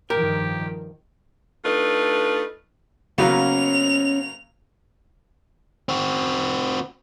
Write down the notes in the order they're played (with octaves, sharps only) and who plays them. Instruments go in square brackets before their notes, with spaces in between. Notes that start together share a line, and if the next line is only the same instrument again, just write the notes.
[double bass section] G2 D#3 F3 [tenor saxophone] G4 [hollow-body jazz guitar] A#4
[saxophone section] A3 D4 D#4 F4 A4 B4
[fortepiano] C#3 F#3 A#3 [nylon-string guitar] B3 C#4 F5 [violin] F7
[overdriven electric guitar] C4 F#4